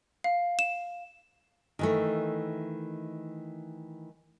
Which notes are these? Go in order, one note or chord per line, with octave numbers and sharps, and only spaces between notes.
F5
E7
D#3 E3 A3